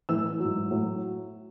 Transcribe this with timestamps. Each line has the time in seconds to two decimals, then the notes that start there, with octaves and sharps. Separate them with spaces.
0.09 A2 E3 E6
0.40 G#2 F#3
0.71 A2 F#3